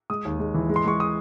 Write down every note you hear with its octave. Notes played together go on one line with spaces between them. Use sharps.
G#3 D#6
D#2
G#3
E3
G#3
C6
G#3 C#6
D#6